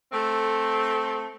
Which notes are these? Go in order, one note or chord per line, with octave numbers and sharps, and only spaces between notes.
A3 C4 A4